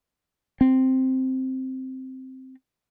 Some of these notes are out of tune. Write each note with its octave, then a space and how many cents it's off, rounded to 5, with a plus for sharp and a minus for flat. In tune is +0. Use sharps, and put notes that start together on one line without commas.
C4 +0